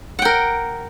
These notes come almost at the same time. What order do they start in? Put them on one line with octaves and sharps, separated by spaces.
F#5 G5 A#4